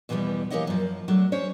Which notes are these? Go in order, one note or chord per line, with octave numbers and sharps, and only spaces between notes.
E2 B2 E3 F3 G3 B3
E3 A#3 G4 C#5 D#5 F#5
F#2 F3
F#3 A3 D4
C#4 C5 C#5